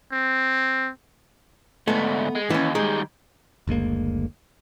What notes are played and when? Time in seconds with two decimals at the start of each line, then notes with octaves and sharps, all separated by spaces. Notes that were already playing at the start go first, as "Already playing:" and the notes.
0.12 C4
1.88 D2 G#2 A3 B3
2.35 G#3
2.50 D#2 E3 C#4
2.75 D#3 G3 G#3
3.67 F#1 D2 G#3 A#3